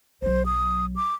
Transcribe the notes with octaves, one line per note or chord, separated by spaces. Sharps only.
B1 F#3 C5
D#6
D6